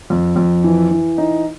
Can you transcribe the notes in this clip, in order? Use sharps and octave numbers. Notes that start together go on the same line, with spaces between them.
F2
F2
E3
E3
D#4